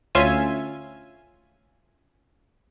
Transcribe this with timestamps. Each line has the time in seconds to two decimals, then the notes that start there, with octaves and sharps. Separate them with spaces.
0.15 D2 C#4 F4 E5 G#5